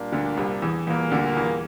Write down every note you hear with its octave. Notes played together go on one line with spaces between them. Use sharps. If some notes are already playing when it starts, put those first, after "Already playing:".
Already playing: A#2 G3 A#3 D4
D2 D3
C2 C3
E2 E3
E2 A#2 E3 G3 A#3
D2 D3
E2 E3